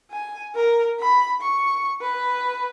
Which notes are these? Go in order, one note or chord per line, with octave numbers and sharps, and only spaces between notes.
G#5
A#4
B5
C#6
B4